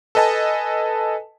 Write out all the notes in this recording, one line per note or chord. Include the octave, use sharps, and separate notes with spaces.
A4 B4 D#5 G#5 A5